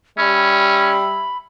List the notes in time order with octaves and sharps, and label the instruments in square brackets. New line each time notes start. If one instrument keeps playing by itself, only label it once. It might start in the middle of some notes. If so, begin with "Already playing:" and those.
[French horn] G3 [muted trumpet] C#4 [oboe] E5 [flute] B5